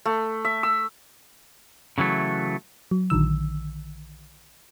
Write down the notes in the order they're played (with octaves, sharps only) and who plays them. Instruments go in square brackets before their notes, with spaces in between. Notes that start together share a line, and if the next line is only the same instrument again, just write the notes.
[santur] A3
E5
E6
[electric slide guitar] C#3 E3 F#3 A3
[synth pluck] F#3
A#1 D3 D#3 E6